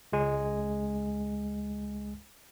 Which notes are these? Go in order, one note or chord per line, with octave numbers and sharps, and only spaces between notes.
C#2 G#3 G#5